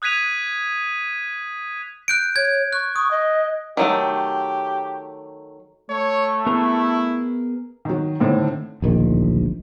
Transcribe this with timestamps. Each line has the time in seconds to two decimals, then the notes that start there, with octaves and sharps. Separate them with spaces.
0.02 D#6 F#6 G#6 B6 D#7 F7
2.08 F#6 G6 D7
2.36 C#5 G#6
2.73 C#6 F#6
2.96 C#6 D#6
3.11 D#5
3.77 D#3 F#3 A3 G4
5.90 A3 C#5
6.46 B3 E4 G#4 A#4
7.85 D#3 F#3
8.20 A2 D3 D#3 C4
8.82 D1 A#1 D#3